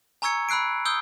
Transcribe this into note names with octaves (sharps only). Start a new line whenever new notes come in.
G#5 A#5 C#6 E6 G#6 C#7
B5 E6 F#6 C7 D7
D#6 E6 G6 G7